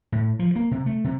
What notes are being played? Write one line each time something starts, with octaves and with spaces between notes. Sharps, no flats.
A2
F3
A#3
C3
A3
C3